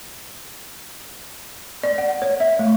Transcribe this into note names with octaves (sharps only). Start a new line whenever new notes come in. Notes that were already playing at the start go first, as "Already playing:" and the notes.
D5
F#5
C#5
E5
A3